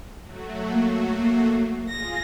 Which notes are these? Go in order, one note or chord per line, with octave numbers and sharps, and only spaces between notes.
F#3 A3 F#4
A#3
A#3
F4 G#4 A#6